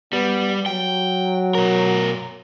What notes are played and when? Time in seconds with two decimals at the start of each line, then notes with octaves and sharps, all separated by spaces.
0.13 G3 B3
0.66 F#3 G5
1.55 B2 A#4